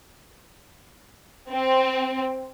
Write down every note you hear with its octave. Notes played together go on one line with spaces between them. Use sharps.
C4